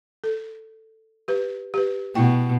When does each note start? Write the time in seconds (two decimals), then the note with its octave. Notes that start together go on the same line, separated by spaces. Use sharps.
0.24 A4
1.28 G4 B4
1.74 G4 B4
2.15 B2 A3 E4 G5